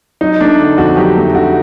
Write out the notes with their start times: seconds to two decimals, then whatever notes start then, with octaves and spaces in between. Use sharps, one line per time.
0.21 F#3 D#4
0.40 A3 D4
0.59 D3
0.78 F2 F#4
0.97 F#3 G4
1.17 A3
1.35 D3 F#4